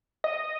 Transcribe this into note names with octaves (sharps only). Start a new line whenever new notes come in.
D#5